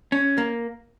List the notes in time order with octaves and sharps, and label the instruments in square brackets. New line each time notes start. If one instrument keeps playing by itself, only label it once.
[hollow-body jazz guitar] C#4
A#3